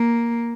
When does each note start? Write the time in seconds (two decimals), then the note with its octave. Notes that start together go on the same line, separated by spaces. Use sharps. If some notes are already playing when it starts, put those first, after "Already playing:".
Already playing: A#3